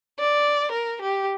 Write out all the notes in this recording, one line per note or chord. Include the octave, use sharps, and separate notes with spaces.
D5
A#4
G4